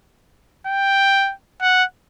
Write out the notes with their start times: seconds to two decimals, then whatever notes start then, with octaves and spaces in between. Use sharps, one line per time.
0.67 G5
1.62 F#5